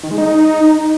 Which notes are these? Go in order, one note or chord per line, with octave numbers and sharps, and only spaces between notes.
D#3
G#3
D#4